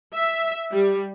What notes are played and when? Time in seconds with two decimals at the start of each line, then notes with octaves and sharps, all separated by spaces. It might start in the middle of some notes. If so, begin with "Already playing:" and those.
0.14 E5
0.72 G3